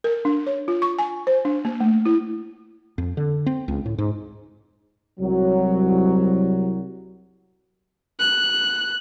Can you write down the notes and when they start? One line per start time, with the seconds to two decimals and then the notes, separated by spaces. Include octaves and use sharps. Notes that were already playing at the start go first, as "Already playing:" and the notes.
0.04 A#4
0.25 D4
0.47 C#5
0.68 F4
0.82 C#6
0.99 G#5
1.27 C5
1.45 D4
1.65 A#3
1.80 A3
2.06 E4
2.98 F2
3.17 D3
3.46 C4
3.68 C#2
3.86 A2
3.98 G#2
5.20 C2 F#3
8.20 F#6